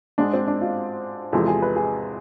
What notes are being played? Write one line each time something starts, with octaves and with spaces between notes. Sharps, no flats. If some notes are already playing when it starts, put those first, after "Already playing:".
G#2 G#3 D4
C4
D4
F4
E2 C3 F3 G#3 A4
G#4
B4
G#4